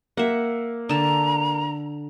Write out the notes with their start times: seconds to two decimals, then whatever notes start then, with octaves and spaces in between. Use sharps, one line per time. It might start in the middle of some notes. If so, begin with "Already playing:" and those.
0.17 A#3 E5 F#5
0.89 D3 A5 A#5